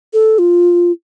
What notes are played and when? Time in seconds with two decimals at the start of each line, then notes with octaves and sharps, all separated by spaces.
0.13 A4
0.39 F4